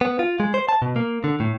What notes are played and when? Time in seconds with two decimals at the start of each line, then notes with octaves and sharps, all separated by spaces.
0.01 B3
0.19 F4
0.40 G#3
0.54 C5
0.69 A5
0.82 B2
0.96 A#3
1.24 D3
1.40 A2